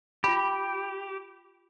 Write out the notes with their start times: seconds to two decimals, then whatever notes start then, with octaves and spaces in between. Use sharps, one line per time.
0.24 F4 G4 B5